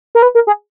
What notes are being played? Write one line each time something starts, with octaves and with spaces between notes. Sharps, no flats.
A#4
B4
A#4
G#4